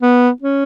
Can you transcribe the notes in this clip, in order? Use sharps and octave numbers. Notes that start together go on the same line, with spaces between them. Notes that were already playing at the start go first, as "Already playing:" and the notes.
B3
C#4